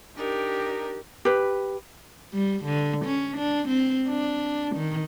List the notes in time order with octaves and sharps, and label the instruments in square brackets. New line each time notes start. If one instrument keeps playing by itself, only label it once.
[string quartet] D4 D#4 A#4 [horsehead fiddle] G4
[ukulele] G4 B4
[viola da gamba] G3
D3
C#4
D4
C4
D4
D#3